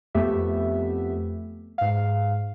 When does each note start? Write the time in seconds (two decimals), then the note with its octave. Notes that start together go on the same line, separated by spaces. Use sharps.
0.15 F2 A3 B3 G4 E5
1.78 G#2 F5